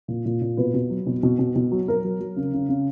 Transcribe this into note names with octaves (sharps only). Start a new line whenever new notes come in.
A#2
A#2
A#2
B2 B4
B2
F#3
B2
B2
B2
B2
F#3
F#3 A#4
F#3
F#3
C#3
C#3
C#3